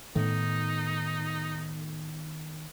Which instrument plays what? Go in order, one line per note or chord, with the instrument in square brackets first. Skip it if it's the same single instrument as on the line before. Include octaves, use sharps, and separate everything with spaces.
[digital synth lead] A2 [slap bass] D#3 B3 [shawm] D#4